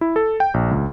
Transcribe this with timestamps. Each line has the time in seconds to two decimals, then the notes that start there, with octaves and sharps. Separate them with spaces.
0.01 E4
0.16 A4
0.40 G5
0.54 A#1
0.71 C#2